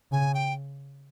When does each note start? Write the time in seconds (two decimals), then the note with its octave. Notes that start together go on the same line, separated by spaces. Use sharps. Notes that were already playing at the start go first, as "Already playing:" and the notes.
0.12 C#3 G#5
0.34 G5